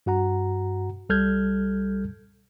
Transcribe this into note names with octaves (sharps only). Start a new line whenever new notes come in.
G2 F#4 F#5 A#5
C2 G3 A4 F6 G6 G#6